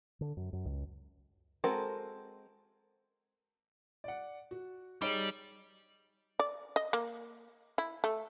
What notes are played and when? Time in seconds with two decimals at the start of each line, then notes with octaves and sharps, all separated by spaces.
0.21 D3
0.37 F#2
0.53 F#2
0.65 C#2
1.64 G#3 C4 F#4 A4 A#4
4.04 D5 F#5
4.51 F#4
5.02 G3 D#4 G#4 C#5
6.40 D5
6.76 D#5
6.93 A#3
7.78 E4
8.04 A3